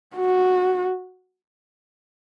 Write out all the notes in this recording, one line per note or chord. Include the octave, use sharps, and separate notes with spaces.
F#4